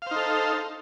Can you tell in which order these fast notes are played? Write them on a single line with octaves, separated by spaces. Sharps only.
F5 C5 D#4 A4